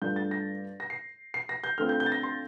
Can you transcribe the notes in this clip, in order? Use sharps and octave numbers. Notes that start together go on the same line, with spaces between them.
G2 D3 A3 D4 F4 G6
A6
A#6
A#6
C7
C7
A#6
G6
D3 A3 C4 F4 F6
G6
G6
A6
A#6
C6